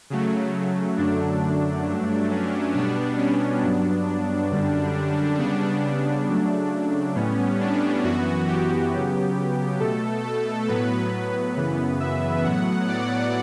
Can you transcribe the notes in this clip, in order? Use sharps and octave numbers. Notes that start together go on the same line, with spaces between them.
C#3 F#3 A3
F#2 D3 F#3 A3 D4
G2 F#3 A3 D4
C#4
B2 G3 B3 D4
C#4
G2 F#3 B3 D4
D4
F#2 D3 G3
C#3 G3 B3 D4
C#3 F#3 A3
D4
A2 G3 B3 C#4
D4
F#2 E3 B3 F#4
G4
C#3 F#3 B3
B2 A3 A4
A4
A2 F#3 B3 B4
F#2 C#3 E3 B3
E5
A2 F#3 B3 F#5
D5